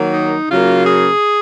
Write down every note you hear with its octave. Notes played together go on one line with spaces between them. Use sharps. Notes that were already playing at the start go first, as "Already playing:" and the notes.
Already playing: D#3 F#3 A#3
D#4
C#3 F#3 A#3 F4
G#4